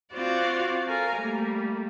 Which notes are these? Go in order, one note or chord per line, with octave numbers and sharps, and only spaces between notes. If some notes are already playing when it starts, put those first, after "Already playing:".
C4 F4 F#4 C5 D5
A4 A#4 F5 G#5 A#5
G3 A3 A#3